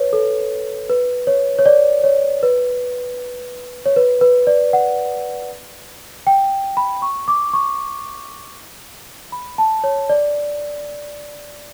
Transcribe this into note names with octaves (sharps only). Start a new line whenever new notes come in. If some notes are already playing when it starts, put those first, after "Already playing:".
Already playing: B4 C#5
A4
B4
C#5
C#5
D5
C#5
B4
C#5
B4
B4
D5
F#5
G5
B5
C#6
D6
C#6
B5
A5
C#5
D5